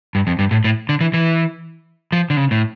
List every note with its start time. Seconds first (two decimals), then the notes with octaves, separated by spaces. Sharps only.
0.15 G2
0.27 F2
0.39 G2
0.51 A2
0.64 A2
0.89 D3
1.01 E3
1.14 E3
2.12 F3
2.30 D3
2.37 C#3
2.51 A2